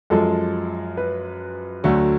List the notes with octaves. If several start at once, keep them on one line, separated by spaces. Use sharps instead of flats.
F#2 F3 G#3 A4
B4
D2 D3 F#3 A3